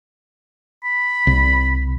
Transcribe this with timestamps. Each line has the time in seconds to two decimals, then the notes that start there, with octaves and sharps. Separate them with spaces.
0.84 B5
1.27 C2